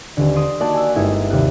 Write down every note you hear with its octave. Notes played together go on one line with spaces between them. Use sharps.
D#1 D3
C6 D#6 C7 D7
A#3 D#4 F#4 D5 F#5 A5
G#5 E6
G1 G#3 D#4 E4 G#6 E7
D#2 C3 F4 F#6